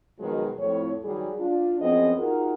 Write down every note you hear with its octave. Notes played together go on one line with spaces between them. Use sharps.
B2 D#3 F3 F#3 G#3 F4
F2 A2 C#5
D#3 F#3 G3 G#4
D4 F4
F#2 F3 B3 C4 G#4 D#5
D#4 F4 F#4 G#4 A#4